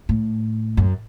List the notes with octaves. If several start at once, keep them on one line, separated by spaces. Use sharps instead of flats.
A2
F#2